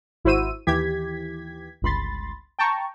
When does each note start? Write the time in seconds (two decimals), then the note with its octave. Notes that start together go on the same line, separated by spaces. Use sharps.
0.24 G#1 E4 F#4 C5 E6 D#7
0.67 D#2 E3 G4 G#6 B6
1.82 G1 C#2 B5 C6 A6
2.59 G5 A5 A#5 C#6